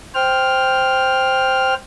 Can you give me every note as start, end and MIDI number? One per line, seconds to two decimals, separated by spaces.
0.14 1.74 72
0.14 1.74 79
0.14 1.74 89